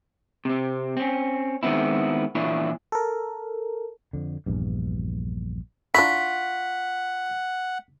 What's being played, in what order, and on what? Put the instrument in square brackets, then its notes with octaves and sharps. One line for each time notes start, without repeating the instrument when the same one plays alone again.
[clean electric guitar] C3 C4
C4 C#4
D#3 G#3 B3 C4 E4
A#2 E3 D4 E4 B4 C#5
[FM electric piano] A4 A#4
[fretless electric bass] F2 D3
A#1 E2 G2
[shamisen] D4 E4 [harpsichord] F4 A#5 C#6 [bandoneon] F#5 [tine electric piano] B6